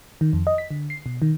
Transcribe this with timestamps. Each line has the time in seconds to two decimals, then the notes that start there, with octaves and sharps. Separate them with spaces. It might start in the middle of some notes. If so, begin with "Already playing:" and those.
0.21 D#3
0.33 F2
0.47 D#5
0.58 B6
0.71 D3
0.90 C7
1.06 B2
1.22 D#3